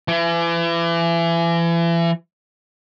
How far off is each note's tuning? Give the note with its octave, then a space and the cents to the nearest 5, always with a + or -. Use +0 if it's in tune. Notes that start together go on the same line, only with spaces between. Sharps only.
E3 +35